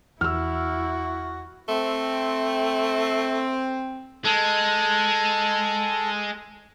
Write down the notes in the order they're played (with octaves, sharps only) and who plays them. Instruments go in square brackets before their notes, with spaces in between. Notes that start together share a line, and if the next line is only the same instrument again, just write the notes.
[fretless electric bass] E2 [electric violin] E4 [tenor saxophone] F#4 [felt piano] E6 F6
[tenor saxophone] A3 [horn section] C4
[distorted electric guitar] G#3 [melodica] A4